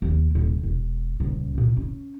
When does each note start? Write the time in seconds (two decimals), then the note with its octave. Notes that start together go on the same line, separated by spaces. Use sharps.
0.02 D#2 A#3
0.35 D#1 E2
0.63 E1
1.20 D#1 C#2
1.58 A#2
1.77 C#4